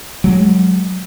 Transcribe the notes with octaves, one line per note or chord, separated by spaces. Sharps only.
F#3 G#3